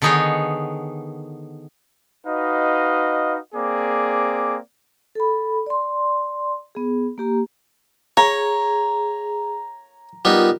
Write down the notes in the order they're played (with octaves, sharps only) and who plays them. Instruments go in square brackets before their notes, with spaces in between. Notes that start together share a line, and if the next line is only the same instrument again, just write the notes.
[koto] D3 D#3 B3 D#4 G#4 C#5
[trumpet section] D#4 F#4 B4 D#5 F5
A#3 C4 G#4 D5 D6
[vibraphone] A4 B5
D5 C6
B3 G#4
A#3 G4 A#5
[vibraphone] G#4 [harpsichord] C#5 [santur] A#5
[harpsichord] G3 B3 D#4 [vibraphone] F4 A#4